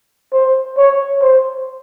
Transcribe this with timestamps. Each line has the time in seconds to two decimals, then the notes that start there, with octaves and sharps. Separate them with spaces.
0.33 C5
0.78 C#5
1.22 C5